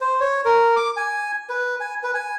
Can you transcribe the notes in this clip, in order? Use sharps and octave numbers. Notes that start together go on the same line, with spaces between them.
C5
C#5
A#4
D6
G#5
B4
G#5
B4
G#5